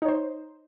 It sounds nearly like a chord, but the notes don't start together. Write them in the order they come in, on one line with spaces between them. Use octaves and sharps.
D#4 C#5 C5